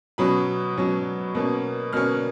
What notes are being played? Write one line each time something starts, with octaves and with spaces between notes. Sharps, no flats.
B2 F#3 C#4 B5
B2 F#3 C#4
B2 A#3 C#4
B2 A#3 C#4 F6